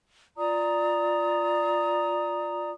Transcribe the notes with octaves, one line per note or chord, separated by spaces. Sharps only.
F4 D5 A#5 D#6